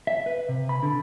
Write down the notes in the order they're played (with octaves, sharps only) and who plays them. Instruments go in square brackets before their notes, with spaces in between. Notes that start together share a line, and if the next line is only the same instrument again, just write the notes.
[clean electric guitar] E5
B4
C3
B5
D3